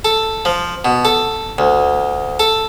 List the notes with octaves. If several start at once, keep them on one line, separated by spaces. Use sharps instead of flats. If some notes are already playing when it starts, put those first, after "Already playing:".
A4
F3
B2
A4
D2
A4